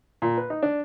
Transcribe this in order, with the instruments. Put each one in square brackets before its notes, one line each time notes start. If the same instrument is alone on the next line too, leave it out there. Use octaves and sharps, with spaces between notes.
[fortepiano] A#2
B4
D#4
D4